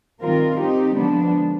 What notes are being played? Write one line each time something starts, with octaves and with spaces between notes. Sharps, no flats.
D#3 G3 C4 F4 A#4
C4 D#4 G4
D3 F3 G#3 B3 D4